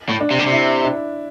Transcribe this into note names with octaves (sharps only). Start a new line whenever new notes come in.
A2
D4
C3
D3
C3
E4
D4